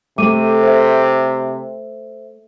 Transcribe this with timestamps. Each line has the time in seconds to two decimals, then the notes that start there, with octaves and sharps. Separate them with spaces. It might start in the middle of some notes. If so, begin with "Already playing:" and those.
0.18 C3 A3 D6 D#7
0.63 C5 E5